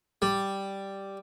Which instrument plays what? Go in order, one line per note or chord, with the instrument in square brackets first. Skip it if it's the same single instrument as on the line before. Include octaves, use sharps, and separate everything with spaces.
[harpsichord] G3